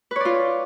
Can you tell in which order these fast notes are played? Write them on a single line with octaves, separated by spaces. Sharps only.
B4 C#5 D5 F4